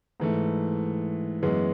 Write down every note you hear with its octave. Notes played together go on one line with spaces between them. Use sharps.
G#2 E3 A3
F#2 E3 G#3 B3